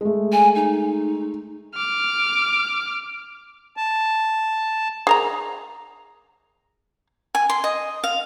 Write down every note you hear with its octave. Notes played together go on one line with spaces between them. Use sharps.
G#3 A3
G#5
D#4
D6 F6
A5
G#4 A#4 A#5
G#5
C6
D#5
F5